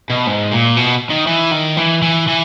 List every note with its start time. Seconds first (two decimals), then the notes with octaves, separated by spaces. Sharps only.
0.10 B2
0.27 G#2
0.52 A#2
0.77 B2
1.10 D#3
1.27 E3
1.52 D#3
1.77 E3
2.02 E3
2.28 E3